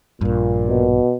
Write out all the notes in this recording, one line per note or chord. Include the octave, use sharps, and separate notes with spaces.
A#1 G2 A#2
B2